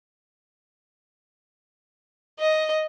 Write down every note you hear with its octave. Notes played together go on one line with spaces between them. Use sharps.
D#5